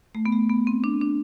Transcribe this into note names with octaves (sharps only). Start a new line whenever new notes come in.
A3
B3
A3
B3
C4
D4
D4